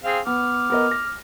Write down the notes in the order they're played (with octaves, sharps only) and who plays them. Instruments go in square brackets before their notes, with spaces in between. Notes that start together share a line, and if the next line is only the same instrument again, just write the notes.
[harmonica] C4 G#4 F5
[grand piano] B3 [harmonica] D6 F6
[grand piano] B3 A#4 D#5
A#6